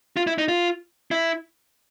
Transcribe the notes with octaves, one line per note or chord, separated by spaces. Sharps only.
F4
E4
D#4
F4
E4